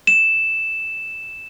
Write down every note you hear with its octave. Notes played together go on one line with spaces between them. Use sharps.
E7